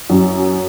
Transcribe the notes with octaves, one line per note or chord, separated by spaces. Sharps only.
F#2